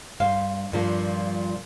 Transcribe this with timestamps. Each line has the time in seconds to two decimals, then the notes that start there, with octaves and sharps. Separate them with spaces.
0.20 G2 C5 F5
0.72 G2 A#2 F3